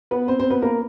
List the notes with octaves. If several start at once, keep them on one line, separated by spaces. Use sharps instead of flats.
B3 B4
C4 C5
C4 C5
B3 B4
A#3 A#4